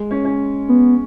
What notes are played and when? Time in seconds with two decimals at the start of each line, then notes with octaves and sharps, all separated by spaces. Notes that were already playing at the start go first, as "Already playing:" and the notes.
Already playing: G#3
0.11 C#4
0.25 C#4
0.69 B3